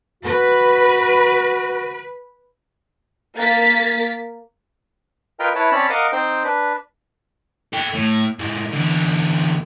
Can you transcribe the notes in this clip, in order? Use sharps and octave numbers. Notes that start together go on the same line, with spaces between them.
F#4 B4
A#3 A6 B6
F4 A#4 B4 D#5 G5 A#5
E4 B4 C#5 A5
C4 C#4 C#5 D5 A5 B5
A#4 D#5 F5 F#5 D6 D#6
C4 D#4 C5 G5
D4 B4
A4 G5
A2
A2 G#3
E2 D3